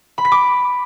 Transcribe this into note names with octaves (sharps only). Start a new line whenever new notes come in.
B5
B6
D6